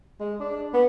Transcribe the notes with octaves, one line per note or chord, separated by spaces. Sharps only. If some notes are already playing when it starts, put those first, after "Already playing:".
G#3
D4
B3